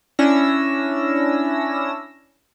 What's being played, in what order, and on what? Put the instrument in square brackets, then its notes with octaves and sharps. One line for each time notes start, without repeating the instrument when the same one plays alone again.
[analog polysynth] C#4 D4 E4 E6 A#6